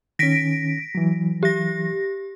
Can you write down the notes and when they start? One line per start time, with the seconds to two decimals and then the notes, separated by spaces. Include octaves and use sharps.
0.19 D#3 C#4 A#6 B6 D7
0.95 E3 F#3
1.43 G4 A#6